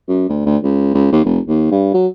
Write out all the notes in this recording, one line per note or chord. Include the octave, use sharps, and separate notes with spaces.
F#2
D2
D2
C#2
C#2
D#2
F1
D#2
G2
F#3